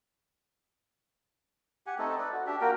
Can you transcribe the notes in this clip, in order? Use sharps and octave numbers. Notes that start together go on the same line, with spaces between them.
G4 F#5 G#5
A3 C4 D#4 A4
A4 B4 D5
F#4
D4 G4 E5
A#3 F#4 A#4 G5